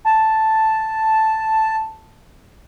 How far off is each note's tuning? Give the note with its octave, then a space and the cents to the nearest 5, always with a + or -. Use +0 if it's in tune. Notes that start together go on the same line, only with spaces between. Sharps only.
A5 +0